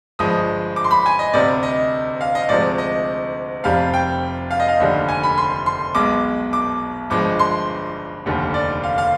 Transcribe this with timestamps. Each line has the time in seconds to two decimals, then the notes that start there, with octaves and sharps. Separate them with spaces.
0.19 G1 G2 F3 G#3 D#6
0.76 D6
0.84 C6
0.91 B5
1.06 G#5
1.19 D#5
1.33 D2 C3 G3 D5
1.63 D#5
2.21 F5
2.35 D#5
2.49 D2 C3 F3 G#3 D5
2.78 D#5
3.64 F1 F2 C3 G3 F5
3.94 G5
4.51 F5
4.60 D#5
4.69 F5
4.80 F1 D#2 D3 G3
5.09 G#5
5.23 B5
5.38 C6
5.66 C6
5.95 B1 B2 G#3 D6
6.53 D6
7.10 G1 G2 F3 G#3 D6
7.39 C6
8.26 F1 D#2 D3 G3
8.54 D5
8.83 F5
8.98 F5